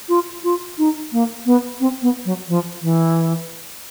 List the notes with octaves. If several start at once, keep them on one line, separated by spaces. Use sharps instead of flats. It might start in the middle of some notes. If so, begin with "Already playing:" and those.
F4
F4
D#4
A#3
B3
C4
B3
F#3
F3
E3